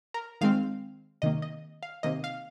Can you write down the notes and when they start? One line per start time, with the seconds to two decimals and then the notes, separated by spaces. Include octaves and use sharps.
0.14 A#4
0.41 D#3 G#3 C4 F5
1.22 C3 D#3 A#3 D#5
1.42 D#5
1.83 F5
2.03 C3 D#3 A#3 D#5
2.24 F5